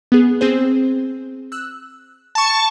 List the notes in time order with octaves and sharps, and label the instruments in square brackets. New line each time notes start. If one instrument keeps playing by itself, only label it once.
[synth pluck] B3 G#4
C4 G#4 C5
E6 F#6
[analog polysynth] A5 C#6